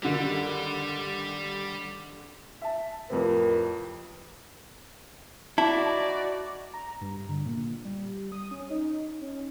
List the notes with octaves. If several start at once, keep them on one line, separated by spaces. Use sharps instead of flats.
G2 D3 D#3 G3
E5 A5
F2 A2 C3 A#4 B4
D#4 E4 F#4 D5 A5
A#5
G2
D3
A#2
G3
D#6
C#4
D#4
C#4